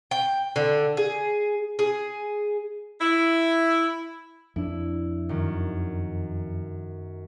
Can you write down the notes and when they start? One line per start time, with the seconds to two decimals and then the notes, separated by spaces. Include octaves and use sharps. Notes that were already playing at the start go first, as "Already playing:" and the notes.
0.11 G5
0.56 D3
0.97 G#4
1.79 G#4
3.01 E4
4.56 F2 D4 E4
5.29 F#2 D#3